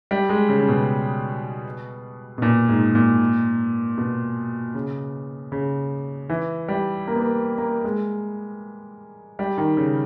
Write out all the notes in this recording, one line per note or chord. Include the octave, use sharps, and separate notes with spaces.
G3
G#3
C#3
C#3
B2
B2
A#2
G#2
A#2
B2
C#3
C#3
E3
G3
A#3
B3
A#3
A#3
G#3
G3
D#3
C#3